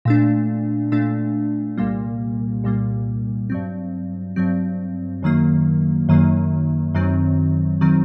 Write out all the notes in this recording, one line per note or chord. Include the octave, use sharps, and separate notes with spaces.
A#2 A3 D4
A#2 A3 D4
C2 A#2 G3 A#3
C2 A#2 G3 A#3
G2 F#3 C4
G2 F#3 C4
F#2 D#3 F#3 A#3
F#2 D#3 F#3 A#3
F#2 D#3 F#3 C4
D#3 F#3 C4